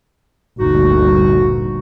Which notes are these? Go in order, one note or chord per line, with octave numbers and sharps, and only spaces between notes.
G1 D2 A#2 D#4 F#4